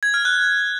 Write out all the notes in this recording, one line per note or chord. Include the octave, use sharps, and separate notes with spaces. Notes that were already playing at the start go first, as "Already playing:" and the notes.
G#6
F6
F#6